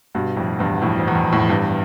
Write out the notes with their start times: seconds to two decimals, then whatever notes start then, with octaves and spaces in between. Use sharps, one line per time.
0.15 G2 B2
0.37 F2 A2
0.59 E2 G2
0.82 F2 A2
0.99 F2
1.08 E2
1.15 F2
1.32 F2 A2
1.49 E2 G2